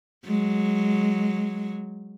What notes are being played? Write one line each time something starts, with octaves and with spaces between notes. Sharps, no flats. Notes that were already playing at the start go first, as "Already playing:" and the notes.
F#3 G#3